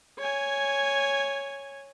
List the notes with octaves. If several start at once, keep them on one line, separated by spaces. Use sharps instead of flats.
C#5 G#5